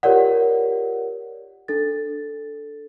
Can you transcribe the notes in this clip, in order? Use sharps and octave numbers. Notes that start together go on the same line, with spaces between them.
F4 G4 A#4 C#5 D5 F#5
D4 A4 A6